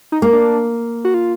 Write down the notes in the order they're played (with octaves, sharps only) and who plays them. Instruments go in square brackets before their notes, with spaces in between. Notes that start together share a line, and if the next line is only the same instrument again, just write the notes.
[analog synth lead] D#4
[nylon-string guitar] A#3
[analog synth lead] D4
F#4
F4